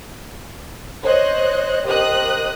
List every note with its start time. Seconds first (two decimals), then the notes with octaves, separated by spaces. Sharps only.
1.02 C5 C#5 D#5 F#6
1.85 G4 A#4 C5 D#5 D#6 F#6